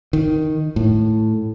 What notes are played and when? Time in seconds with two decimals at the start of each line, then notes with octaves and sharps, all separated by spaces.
0.13 D#3
0.76 A2